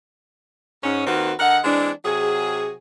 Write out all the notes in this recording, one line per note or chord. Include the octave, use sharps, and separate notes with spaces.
G#2 C#4
D#2 D#3 A#3 C4 F#4 B4
D3 A#4 D#5 F#5
E3 G#3 C4 D4
C3 F#3 F#4 G#4